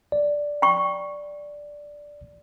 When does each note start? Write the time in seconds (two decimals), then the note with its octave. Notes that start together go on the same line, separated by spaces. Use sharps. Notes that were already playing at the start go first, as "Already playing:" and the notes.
0.12 D5
0.62 G5 C#6